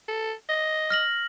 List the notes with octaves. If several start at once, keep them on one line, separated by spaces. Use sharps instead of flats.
A4
D#5
F6 A#6 F#7